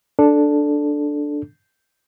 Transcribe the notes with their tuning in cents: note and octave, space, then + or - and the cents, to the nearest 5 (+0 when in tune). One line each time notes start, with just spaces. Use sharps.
D4 +0 A4 -5